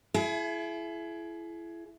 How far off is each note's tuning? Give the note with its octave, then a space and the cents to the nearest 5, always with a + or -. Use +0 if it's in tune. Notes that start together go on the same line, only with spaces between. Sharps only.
E4 +25 G#4 +40